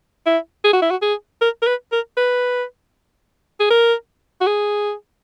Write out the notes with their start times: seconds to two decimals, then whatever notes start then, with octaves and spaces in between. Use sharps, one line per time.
0.26 E4
0.65 G#4
0.73 F#4
0.82 E4
0.91 F#4
1.02 G#4
1.41 A#4
1.62 A#4
1.67 B4
1.92 A#4
2.17 B4
3.60 G#4
3.71 A#4
4.41 F#4
4.47 G#4